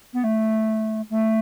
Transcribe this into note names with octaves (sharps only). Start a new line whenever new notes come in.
B3
A3
A3